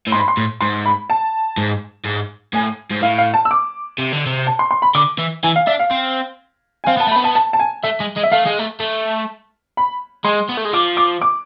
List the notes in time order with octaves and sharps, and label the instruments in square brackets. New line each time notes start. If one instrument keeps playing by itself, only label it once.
[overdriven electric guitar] A2
[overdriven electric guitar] G#2 [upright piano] C6
[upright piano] B5
C6
[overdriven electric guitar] A2
[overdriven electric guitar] G#2 [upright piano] C6
[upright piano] B5
A5
[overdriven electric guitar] G#2
G#2
[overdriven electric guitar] A2 [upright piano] G#5
[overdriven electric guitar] G#2
[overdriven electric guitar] A2 [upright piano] F5
[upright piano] F5
A5
E6
D6
[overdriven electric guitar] C3
D3
C3
[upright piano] A5
C6
C6
B5
[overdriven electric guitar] D3 [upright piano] D6
[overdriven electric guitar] E3
[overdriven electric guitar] E3 [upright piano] G#5
[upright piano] F5
[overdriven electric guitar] D4 [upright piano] E5
[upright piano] F5
[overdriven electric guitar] C4
[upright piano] G#5
[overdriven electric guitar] C4 [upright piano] F5
[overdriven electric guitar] B3 [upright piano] A5
[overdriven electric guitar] A3
[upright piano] B5
[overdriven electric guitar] B3
[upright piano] A5
A5
A5
G#5
[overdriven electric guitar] A3 [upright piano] E5
[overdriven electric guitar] G#3
G#3
[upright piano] E5
[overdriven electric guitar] A3 [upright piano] F5
[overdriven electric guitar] G#3
A3
A3
[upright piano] B5
[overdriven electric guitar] G#3 [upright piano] C6
[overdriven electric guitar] B3
A3
G#3
[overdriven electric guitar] F3 [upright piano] D6
[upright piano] D6
D6